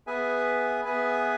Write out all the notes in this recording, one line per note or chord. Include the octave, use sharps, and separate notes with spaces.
B3 G#4 B4 E5 G#5
B3 G#4 B4 E5 G#5